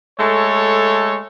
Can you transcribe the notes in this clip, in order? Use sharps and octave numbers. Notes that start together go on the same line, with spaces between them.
G#3 A3 A4 C#5